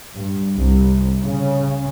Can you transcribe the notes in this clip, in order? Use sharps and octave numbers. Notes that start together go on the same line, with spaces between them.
G2
C2
C#3